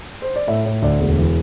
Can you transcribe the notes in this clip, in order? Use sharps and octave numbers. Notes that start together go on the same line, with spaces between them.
C5
D5
A2 E5
A2
D2 D5
E1
E3